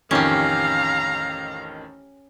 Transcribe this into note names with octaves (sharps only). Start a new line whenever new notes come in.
A1 F2 D#3 C#4 G4 F5 A#5